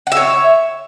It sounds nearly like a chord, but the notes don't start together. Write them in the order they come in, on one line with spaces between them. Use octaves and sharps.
F#5 E5 C#5